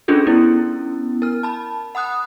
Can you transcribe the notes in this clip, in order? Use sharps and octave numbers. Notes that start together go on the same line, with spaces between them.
C#4 D4 F4 G#4 A4
B3 C#4 E4
A#4 F6
A5 B5
F#5 B5 D#6 F#6